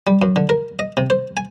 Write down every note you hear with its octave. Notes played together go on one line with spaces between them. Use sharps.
G3
F#2
D3
A#4
D#5
C3
C5
G#5